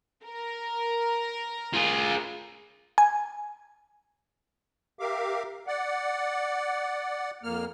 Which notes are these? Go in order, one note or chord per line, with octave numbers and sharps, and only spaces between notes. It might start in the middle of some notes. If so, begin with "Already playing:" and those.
A#4
F4 G#4
G#5
G4 A#4 E5 F5 D6
D5 F#5
F2 A#3 F6